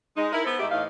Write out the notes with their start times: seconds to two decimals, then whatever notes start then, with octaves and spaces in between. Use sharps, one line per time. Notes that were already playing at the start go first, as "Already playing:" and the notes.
0.17 G#3 D#4
0.33 E4 A#4
0.44 B3 A4 C5
0.59 G#2 A3 D#4 G4 E5
0.71 A2 E3 D#4 F5